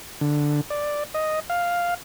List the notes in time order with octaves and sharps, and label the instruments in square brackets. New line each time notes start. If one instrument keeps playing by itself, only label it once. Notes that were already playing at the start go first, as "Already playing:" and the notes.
[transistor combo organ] D3
D5
D#5
F5